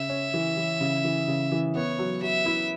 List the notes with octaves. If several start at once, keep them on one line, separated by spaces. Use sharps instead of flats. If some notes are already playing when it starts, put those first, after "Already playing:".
Already playing: C#3 E5
C#4
E3
E3
C#3
E3
C#3
E3
B3 C#5
F#3
F#3 E5
E4